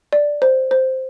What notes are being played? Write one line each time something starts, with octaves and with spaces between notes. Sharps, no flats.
D5
C5
C5